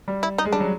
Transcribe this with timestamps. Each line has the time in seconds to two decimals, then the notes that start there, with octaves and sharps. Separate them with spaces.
0.08 G3
0.23 E4
0.38 D#4
0.45 G#3
0.53 G3 D4
0.60 F#3